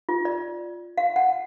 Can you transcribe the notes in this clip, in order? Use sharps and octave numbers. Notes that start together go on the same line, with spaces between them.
F4
D5
F5
F#5